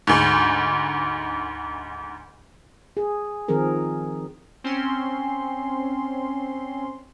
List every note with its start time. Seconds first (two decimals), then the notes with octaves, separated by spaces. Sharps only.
0.07 D2 G#2
2.97 G#4
3.48 D#3 F3 C4 G#4 A#4
4.64 C4 C#4 C6